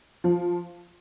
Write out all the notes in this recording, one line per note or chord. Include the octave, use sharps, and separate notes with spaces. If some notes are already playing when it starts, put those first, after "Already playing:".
F3